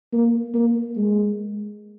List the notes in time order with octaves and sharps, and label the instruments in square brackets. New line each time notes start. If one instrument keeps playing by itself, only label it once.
[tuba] A#3
A#3
G#3